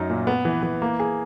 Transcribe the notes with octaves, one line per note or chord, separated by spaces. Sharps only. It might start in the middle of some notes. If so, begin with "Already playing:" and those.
Already playing: F#2 F#3 D#4
A#2
B3
E3
E3
A#3
G#4